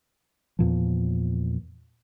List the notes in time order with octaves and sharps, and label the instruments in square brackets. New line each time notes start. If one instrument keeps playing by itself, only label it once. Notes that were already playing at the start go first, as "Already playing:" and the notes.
[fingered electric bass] E2 A#2 F3